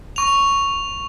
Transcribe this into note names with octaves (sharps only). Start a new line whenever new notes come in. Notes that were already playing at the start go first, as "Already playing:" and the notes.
C#6 F7